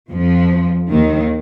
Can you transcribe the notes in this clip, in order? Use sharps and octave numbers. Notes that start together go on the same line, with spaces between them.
F2 F3
D#2 D#3